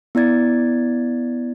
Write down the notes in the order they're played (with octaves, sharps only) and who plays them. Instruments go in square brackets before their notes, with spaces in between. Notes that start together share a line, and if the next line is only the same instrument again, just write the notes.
[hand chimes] B3 E4 D5 G#6 A6